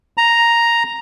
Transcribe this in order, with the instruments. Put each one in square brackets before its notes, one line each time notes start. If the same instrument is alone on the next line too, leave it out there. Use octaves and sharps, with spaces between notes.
[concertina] A#5